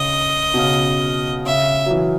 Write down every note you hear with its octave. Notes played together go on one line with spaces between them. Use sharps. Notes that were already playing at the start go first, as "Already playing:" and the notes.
Already playing: C#3 D#5
B2
C#3
C#3 E5
F#3
E3